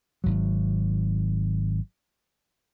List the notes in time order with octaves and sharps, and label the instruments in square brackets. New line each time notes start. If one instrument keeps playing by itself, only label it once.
[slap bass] G#1 F#3